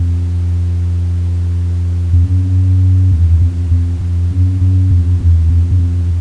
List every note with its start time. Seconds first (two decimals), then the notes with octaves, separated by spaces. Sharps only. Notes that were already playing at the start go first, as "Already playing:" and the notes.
Already playing: F2
2.13 F2
2.23 F#2
3.12 E2
3.42 F2
3.71 F2
4.01 F2
4.31 F#2
4.61 F#2
4.91 F2
5.20 E2
5.50 F2
5.71 F#2
5.80 F2